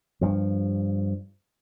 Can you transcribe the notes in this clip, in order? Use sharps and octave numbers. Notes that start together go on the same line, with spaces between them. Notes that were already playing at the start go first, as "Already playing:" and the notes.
G2 F3